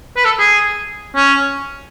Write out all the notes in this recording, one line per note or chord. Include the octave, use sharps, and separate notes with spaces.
B4
A4
G#4
C#4